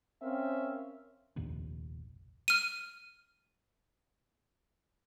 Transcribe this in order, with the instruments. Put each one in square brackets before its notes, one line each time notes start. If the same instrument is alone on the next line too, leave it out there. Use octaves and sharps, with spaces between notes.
[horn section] C4 C#4 A#4 E5 F5
[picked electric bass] F1 A#1 D#2
[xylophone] F6 D#7